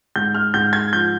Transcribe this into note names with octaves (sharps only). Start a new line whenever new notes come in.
G#2 G6
F6
G#2 G6
G#6
F3 G6